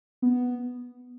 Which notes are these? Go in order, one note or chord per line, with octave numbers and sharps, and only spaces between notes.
B3